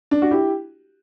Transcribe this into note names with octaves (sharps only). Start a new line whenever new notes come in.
D4
F#4
E4 G4